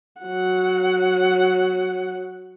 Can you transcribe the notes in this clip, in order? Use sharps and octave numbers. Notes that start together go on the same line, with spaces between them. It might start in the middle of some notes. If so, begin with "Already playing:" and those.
F#3 F#5